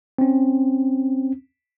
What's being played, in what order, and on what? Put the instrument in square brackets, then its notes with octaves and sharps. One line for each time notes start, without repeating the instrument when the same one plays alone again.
[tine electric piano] C4 C#4